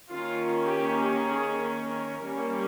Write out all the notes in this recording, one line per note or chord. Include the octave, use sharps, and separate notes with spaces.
D#3 A#3 C#4 F4
G4
G#4
A#4
G3 A#3 C#4